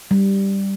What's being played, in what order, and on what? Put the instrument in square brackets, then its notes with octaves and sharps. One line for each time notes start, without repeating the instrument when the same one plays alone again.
[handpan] G3